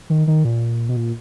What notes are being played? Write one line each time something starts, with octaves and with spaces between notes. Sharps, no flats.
D#3
D#3
A#2
B2
A#2